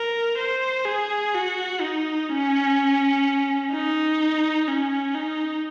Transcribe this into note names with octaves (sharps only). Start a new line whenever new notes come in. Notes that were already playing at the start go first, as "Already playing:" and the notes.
Already playing: A#4
C5
G#4
F#4
D#4
C#4
D#4
C#4
D#4